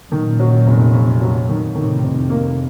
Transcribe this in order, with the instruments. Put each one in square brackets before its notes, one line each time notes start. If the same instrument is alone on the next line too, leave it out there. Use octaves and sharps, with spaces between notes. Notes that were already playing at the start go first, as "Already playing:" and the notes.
[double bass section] F#2 A#2 [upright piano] D#3
[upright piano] F#3
F1
F2
F#3
D#3
[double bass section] A2 C3 [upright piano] D#3
[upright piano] F1
[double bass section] A2 C3 [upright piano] A#3